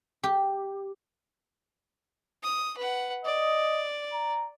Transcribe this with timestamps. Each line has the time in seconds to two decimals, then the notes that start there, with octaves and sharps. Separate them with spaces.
0.23 G4
2.43 D#6
2.77 B4 F#5
3.25 D5 D#5
4.13 A#5